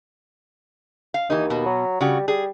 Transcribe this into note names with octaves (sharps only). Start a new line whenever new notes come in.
F5
D#2 E3 D#4
B2 B3
F#3
C#3 G3 F#4
G3 G#4